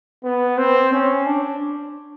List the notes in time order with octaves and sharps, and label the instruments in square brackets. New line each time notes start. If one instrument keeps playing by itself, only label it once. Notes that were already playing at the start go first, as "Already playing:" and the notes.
[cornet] B3
C4
C#4
D4